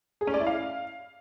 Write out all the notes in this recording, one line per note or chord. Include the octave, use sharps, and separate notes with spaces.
G#4
C#4
D5
E4
F5